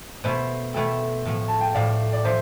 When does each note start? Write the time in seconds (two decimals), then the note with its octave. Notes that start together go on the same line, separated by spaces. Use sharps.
0.24 B2 A3 E4 A4 C5 E5
0.74 B2 A3 E4 A4 E5 G5
1.25 A2 F3 A3
1.48 A5
1.61 G5
1.74 A2 F3 A3 D5 F5
2.13 D5
2.25 F3 C5 E5